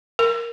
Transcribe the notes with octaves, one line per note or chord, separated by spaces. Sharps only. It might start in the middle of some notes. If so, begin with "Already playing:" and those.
A#4